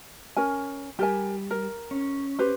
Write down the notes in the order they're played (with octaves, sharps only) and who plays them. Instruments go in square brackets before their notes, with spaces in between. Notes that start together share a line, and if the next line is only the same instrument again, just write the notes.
[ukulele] C#4 A#4 G#5
[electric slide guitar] G3 [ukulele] G4 A#4 G#5
[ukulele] A#4
[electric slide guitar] C#4
[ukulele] G4 B4 C5